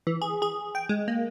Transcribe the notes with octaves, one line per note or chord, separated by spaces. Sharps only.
E3
G#4
G#4
G5
G#3
A#3